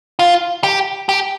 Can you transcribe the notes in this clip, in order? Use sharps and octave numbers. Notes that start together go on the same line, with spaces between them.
F4
G4
G4